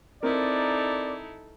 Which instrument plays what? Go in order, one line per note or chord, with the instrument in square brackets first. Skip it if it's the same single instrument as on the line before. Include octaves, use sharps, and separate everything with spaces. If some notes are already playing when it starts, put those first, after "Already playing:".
[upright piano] C4 A#4 [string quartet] D#4 E4 A4 [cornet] D5